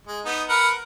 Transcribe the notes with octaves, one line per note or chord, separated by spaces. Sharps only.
G#3
B3 D#4
A#4 B4 F#5